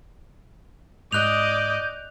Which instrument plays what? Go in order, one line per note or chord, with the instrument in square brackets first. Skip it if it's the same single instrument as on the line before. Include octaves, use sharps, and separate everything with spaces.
[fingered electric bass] G#2 [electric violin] D5 D#5 [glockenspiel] F#6 F7 [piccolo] G6